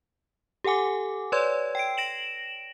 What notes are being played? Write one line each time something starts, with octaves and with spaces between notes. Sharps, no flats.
G4 A4 F#5 G#5 D6
B4 C#5 D5 C6 E6 G#6
G5 C7 D7
A#6 D7 E7 F#7